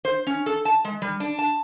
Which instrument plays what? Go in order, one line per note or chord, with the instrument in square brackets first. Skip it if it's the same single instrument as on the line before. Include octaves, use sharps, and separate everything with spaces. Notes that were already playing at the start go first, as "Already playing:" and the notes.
[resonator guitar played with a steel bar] C5
C#4
A4
A5
G#3
G3
D4
A5